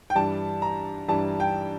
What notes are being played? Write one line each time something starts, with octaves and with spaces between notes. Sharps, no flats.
G5
G2 E3 G3 A5
A#5
G2 E3 G3 A5
G5